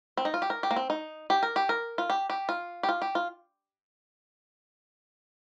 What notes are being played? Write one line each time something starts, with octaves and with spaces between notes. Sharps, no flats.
C4
D#4
F4
G4
A#4
G4
A#3
C4
D#4
G4
A#4
G4
A#4
F4
G4
G4
F4
G4
F4
G4
F4